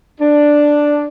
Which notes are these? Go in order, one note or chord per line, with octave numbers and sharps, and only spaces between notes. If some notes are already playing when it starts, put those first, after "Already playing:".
D4